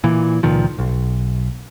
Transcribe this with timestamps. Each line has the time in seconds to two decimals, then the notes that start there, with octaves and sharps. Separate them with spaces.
0.04 A#2 E3
0.43 C#2 A#2 D#3 F3
0.79 B1